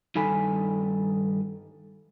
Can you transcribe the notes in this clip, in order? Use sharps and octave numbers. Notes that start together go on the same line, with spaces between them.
G2 D#3 D#4 A4 G#5 B5